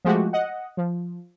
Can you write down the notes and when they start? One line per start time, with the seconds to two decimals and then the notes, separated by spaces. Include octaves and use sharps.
0.05 F3 G#3 A3 F#4 G4
0.33 D#5 F#5
0.77 F3